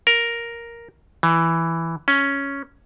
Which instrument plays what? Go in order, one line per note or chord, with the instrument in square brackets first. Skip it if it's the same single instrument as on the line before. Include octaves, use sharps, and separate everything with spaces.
[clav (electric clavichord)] A#4
E3
C#4